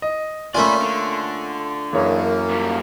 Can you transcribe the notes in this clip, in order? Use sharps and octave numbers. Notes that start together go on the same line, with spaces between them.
D#5
A3 A#3 C#4 F4 D5 G#5 B5
D3
F#2 E3 A#3 G#4 C#5
A#2 G3